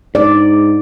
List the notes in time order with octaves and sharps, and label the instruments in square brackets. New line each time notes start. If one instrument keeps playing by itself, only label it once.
[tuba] G#2 [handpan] D5